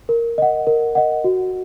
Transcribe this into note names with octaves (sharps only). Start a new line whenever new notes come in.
A#4
D#5 F#5
A#4
D#5 F#5
F#4